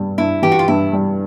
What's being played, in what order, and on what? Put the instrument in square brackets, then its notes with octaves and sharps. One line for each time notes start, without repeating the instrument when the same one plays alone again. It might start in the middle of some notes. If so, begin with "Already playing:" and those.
Already playing: [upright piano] G2 G3
[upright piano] G2 [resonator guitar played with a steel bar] E4
[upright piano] E3 [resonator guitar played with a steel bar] G4
[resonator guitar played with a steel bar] F#4
F4
[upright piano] G2 [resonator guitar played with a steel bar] E4
[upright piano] G3